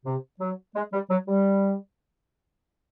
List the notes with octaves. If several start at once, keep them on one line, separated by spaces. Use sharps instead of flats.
C3
F#3
G#3
G3
F#3
G3